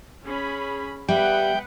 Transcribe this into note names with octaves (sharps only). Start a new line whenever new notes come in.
C#4 G#4 B5
G3 B3 B4 E5 F#5 G5